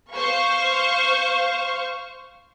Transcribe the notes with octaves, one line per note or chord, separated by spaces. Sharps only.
C5 F5 C#6